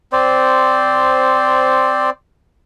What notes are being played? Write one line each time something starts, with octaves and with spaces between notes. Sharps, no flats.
C4 C5 D5